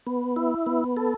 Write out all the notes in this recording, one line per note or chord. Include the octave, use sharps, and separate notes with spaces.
B3
E4
B3
A4